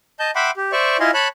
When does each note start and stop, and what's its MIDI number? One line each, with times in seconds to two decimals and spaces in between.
0.19 0.31 75
0.19 0.31 81
0.19 0.31 91
0.35 0.51 76
0.35 0.51 78
0.35 0.51 79
0.35 0.51 83
0.35 0.51 84
0.35 0.51 86
0.57 0.72 67
0.72 0.97 72
0.72 0.97 74
0.72 0.97 76
0.72 0.97 85
1.00 1.11 64
1.00 1.11 65
1.00 1.11 75
1.00 1.11 77
1.00 1.11 80
1.00 1.11 84
1.14 1.28 73
1.14 1.28 81
1.14 1.28 83
1.14 1.28 90